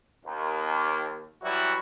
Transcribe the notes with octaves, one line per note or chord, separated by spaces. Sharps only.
D#2
E3 F#3 G3 E4 F#4